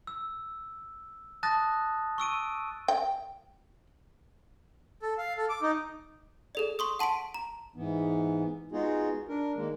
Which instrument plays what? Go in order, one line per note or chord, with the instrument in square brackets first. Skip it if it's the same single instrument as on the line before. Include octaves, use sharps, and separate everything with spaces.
[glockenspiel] E6
A5 D#6 F#6 A6 A#6
C#6 E6 D7 D#7
[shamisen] G5
[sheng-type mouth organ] A4
F5
A4
D6
D#4
[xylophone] G#4 A4 D5
C6 C#6 D#6
F#5 A5 C6 B6 D7
A#5
[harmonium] G#2 E3 B3
G#3 B3 D#4 F4 F#4 G#4
D4 A#4
D#3 G#3 A#3